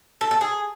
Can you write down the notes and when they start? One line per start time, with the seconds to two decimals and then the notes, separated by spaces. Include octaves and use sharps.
0.21 A4
0.31 A4
0.41 G#4